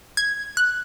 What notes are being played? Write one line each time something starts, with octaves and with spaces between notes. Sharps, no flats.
G#6
F#6